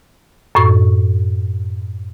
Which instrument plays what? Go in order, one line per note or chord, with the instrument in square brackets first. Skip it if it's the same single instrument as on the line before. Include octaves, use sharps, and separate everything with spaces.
[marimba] F#2 A2 C#6